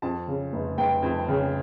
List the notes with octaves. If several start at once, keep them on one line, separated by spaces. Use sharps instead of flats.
F2 A5
C#3
F1
F1 G5
F2
C#3